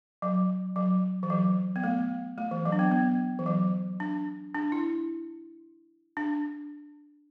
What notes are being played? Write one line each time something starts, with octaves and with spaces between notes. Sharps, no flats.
F#3
F#3
E3
F#3
B3
A3
A3
E3
F#3
D4
B3
B3
E3
F#3
D4
D4
E4
D4